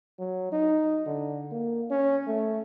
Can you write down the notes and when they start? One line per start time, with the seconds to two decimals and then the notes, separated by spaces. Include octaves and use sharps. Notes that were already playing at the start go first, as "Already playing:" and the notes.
0.19 F#3
0.52 D#4
1.07 D3
1.52 A#3
1.91 C#4
2.27 A3